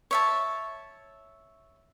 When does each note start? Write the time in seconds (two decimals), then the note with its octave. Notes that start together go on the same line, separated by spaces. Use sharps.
0.11 C#5 E5 A5